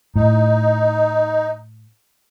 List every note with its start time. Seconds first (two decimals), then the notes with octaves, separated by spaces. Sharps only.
0.16 A2 D#4